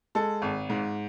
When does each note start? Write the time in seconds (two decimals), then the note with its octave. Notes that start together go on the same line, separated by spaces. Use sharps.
0.15 G#3 A4
0.42 G#1
0.70 G#2